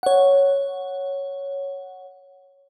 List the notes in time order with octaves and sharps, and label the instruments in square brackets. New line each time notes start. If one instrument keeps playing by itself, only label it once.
[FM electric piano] C#5 F#5